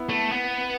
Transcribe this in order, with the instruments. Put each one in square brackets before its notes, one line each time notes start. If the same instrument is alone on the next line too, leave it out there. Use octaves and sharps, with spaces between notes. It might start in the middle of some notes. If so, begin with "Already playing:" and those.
Already playing: [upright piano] B3 E4
[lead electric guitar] A3
B3